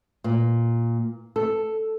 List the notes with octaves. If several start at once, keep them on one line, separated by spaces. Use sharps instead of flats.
A#2
A4